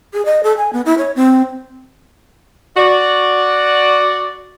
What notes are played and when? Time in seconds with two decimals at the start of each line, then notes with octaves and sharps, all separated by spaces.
0.13 G#4
0.26 D#5
0.43 A4
0.57 G#5
0.73 B3
0.86 E4
0.98 C#5
1.16 C4
2.77 F#4 D5